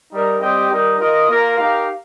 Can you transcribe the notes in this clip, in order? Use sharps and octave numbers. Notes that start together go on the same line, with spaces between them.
G3 D#4 A#4
G3 C4 G4 D#5 G5
G3 D#4 A#4
F4 A#4 D#5
A#3 F4 A#4 F5
D#4 G4 A#4 F5